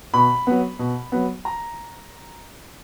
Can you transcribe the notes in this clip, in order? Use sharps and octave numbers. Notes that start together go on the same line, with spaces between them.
B2 B5
F#3 B3
B2
F#3 B3
A#5